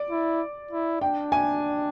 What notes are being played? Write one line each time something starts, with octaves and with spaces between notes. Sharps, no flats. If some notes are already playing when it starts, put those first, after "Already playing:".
Already playing: D5
E4
E4
D4 G5
G#5